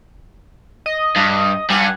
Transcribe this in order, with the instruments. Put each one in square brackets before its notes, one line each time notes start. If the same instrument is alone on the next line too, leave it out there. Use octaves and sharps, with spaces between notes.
[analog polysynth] D#5
[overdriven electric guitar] G2
[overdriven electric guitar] G2 [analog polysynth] F#5 G#5